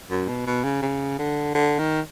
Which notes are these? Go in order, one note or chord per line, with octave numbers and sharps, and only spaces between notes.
F#2
B2
B2
C#3
C#3
D3
D3
D#3